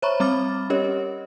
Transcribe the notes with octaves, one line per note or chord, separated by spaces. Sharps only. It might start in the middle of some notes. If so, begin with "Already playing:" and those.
C5 C#5 E5 A#5 B5 C#6
G3 C4 B5 D6 F6 A6
C#4 G4 A#4 C#5 D#5